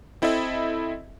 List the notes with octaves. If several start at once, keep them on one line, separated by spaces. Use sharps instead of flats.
C4 E4 A4 D#5 E5